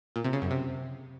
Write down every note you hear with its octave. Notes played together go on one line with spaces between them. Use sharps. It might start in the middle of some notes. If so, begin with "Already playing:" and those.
A#2
C3
C#3
F#2
C3